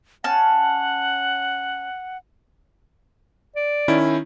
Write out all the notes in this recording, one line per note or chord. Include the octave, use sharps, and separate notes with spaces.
C#4 F#5 A5
D5
D#3 C#4 E4